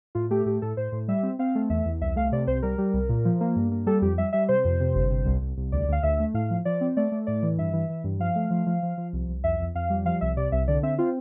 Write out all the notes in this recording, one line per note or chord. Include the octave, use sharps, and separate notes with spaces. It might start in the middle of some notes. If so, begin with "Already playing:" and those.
A2 F4
A3 G4
A2 G4
A2 A4
A2 C5
A2
G3 E5
C4
C4 F5
A3
E2 E5
E2
C2 E5
A3 F5
C3 D5
C2 C5
G3 A#4
G3
C2
A#2
F3
A#3
G2
A#3
G3 A4
F2 G4
G3 E5
G3 E5
C3 C5
F2
C3
G1
C3
C2
C2
C2
D2 D5
D2 F5
D2 E5
A3
A2 F5
F3
F3 D5
C4
A3 D5
A3
A2 D5
E3
G2 E5
E3
E3
G2
F3 F5
A3
F3
F3
F3
F3
C2
C2
F2 E5
F2
F2 F5
G3
F3 F5
C2 E5
C3 D5
C2 E5
D3 D5
C4 E5
C4 F4